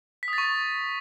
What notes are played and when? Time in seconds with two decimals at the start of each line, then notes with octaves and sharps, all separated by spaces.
0.23 B6
0.28 D#6
0.33 A6
0.38 C#6
0.43 A6